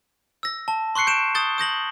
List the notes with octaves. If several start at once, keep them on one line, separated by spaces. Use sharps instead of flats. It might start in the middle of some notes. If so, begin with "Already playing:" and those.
E6 A#6
A5
C6 C#6 F#6 C7 C#7
G6 D7 E7
D#6 G6 A6 G7
D#6 G6 A#6 F#7